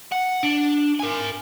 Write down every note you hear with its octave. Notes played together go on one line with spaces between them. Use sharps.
F#5
D4
A#4 G#5